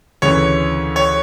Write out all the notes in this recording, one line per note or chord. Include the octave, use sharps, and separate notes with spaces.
D2 C#3 E3 C#5
C#5